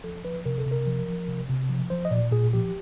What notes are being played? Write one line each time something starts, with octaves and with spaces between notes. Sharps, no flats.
F3 A4
F3 B4
C3 A#4
A4
C3 A#4
F3
F3
C3
C3
F3
F3 C5
D#5
A#2 D5
A#2 G#4
F3 G4